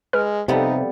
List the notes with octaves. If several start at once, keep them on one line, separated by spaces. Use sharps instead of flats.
G#3 B4 F6
F2 C3 G3 B3 D#4